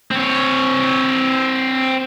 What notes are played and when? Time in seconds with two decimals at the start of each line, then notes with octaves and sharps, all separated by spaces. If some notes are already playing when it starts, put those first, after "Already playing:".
0.11 C4 C#5